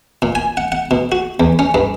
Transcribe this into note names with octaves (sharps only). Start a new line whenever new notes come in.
A#2
G#5
F#5
F#5
B2
F#4
E2
C#4
G2